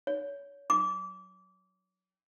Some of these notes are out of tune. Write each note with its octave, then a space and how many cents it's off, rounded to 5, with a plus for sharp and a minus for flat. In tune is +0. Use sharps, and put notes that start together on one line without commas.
C#5 +25
D6 -25